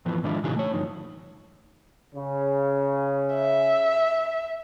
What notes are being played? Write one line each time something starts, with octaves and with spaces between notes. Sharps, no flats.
F2 A2 E3 F3 A3 B3
G#2 D#3 G#3 D4 E4 F4
A#2 C#3 E3 D#4 F#4 G#4
A3 C#5
D2 G2 F3 D#4
C#3
E5